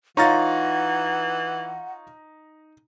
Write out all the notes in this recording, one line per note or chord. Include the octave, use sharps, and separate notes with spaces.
E3 D#4 F4 C#5 F#5 A#5 A6